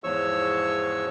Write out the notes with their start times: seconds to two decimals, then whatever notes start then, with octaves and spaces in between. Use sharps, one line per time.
0.04 E2 G#2 F3 C#5 C#6 E6